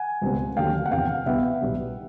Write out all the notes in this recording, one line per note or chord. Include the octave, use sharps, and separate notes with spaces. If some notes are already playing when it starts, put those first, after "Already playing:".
Already playing: F#5 G#5
C#2 B2 G3 C4
D#2 D3 F#3 A3 C4 F5 G5
F#5
E2 C3 F3 F5 G5
C2 B2 G3 B3 E5 F#5
B1 B2 G3 B3